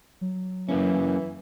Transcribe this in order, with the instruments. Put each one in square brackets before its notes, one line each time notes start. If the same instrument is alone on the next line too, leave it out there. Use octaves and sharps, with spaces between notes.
[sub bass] F#3
[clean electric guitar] F#2 A#3 C#4 [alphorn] E3